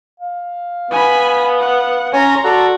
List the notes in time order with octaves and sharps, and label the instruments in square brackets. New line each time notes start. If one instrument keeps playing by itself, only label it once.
[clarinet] F5
[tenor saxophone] B3 [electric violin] G#5 B5
[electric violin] F#5
[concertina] C#4 C#5 G#5 [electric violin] A#5 C6
[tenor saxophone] F#4 [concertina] A4 [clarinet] D5